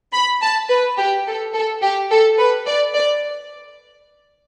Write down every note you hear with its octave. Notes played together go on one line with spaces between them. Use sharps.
B5
A5
B4
G4
A4
A4
G4
A4
B4
D5
D5